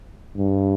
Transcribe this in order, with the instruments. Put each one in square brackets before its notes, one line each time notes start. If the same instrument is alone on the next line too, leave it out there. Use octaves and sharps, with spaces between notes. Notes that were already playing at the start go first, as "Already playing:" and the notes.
[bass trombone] G2